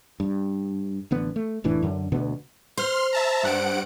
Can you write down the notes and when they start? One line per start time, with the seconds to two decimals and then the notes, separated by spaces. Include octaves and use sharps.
0.20 G2
1.11 A1 D3 B3
1.36 A3
1.64 F1 A2 E3 D4
1.82 F#2 D3
2.12 D2 B2 D3 B3
2.77 C5 C6 F6
3.13 E5 A5 A#5
3.43 G2 F#5 D7